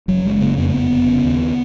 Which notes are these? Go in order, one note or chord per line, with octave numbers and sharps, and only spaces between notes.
F#1 F#3
F#1 G#3
C#3 A#3
F2 B3
A#3
F1 B3
F1
C#3
D#2